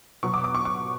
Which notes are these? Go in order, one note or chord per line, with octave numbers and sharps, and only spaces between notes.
B2 F#3 B3 C#6
D6
D6
C#6
C#6